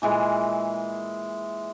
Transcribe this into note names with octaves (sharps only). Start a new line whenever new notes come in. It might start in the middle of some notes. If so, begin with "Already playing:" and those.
A#2 E3 G#3